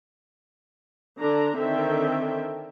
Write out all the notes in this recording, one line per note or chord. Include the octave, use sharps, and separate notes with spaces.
D3 D4 A#5
D3 D#3 C4 E5 G5